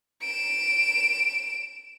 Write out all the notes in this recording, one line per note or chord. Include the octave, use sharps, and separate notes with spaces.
D7 E7